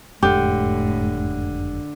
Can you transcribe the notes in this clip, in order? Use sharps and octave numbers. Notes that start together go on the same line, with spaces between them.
F#1 F2 A2 D3 G#3 G4